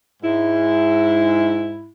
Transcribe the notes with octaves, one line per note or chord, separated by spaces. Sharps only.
G#2 E4